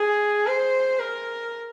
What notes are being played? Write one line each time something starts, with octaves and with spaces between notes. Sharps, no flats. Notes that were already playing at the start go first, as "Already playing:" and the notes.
Already playing: G#4
C5
A#4